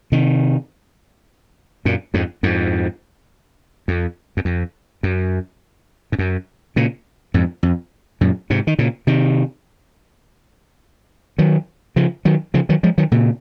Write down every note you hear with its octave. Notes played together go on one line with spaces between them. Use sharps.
C3 D#3
F#2 A#2
F2 G#2
F2 G#2
F2
F#2
F2
F#2
G#2
F#2
A#2 C#3
F2 G#2
F2
F#2 A#2
G#2 C3
D#3
A#2 C#3
C3 D#3
D#3 F#3
C#3 F3
D#3 F#3
C#3 F3
D#3 F#3
F3 G#3
D#3 F#3
A#2 C#3